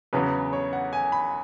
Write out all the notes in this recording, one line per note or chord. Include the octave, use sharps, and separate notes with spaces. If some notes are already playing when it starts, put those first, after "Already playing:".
E2 C#3 F#3 B3 B4
C#5
F#5
G#5
B5